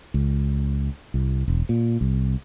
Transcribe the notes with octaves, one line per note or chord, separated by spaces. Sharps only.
C#2
C2
E1
A#2
C2